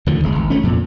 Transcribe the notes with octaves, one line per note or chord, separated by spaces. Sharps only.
D2 D3 D#3 F3
E1 G#3
G#1
D2 G#3 A3 C#4
F2 A#2